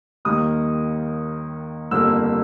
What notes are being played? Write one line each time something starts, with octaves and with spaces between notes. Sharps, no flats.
D#2 D#3 G3 A#3 D#6
G1 F2 D3 G3 A#3 E6